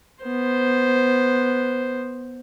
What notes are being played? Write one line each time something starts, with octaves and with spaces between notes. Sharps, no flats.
B3 C5